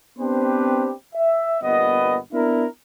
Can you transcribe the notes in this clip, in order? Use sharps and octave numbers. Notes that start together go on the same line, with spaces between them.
B3 C4 D4 G4 B4 C5
E5
G1 A#2 B3 B4 D#5
B3 D4 E4 A#4